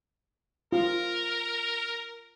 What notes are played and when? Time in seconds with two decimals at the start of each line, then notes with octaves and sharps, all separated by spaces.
0.72 F4 A#4